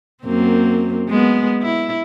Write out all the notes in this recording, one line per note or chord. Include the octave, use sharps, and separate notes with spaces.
F#2 A#3 C4
G#3 B3
E4